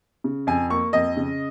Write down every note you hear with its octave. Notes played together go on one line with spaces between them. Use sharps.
C#3
F2 G#5
A#3 C#6
F2 D#5
C#3